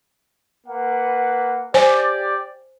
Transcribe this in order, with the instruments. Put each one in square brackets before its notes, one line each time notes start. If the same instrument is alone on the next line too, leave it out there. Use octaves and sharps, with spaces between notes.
[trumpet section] A#3 B4 F#5
[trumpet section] G4 D5 [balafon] C5 G#5